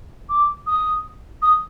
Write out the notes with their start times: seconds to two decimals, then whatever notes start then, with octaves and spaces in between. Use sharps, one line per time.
0.29 D6
0.67 D#6
1.42 D#6